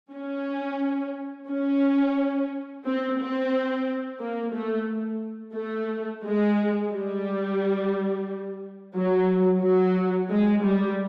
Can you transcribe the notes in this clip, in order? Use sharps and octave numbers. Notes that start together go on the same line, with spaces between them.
C#4
C#4
C4
C4
A#3
A3
A3
G#3
G3
F#3
F#3
G#3
G3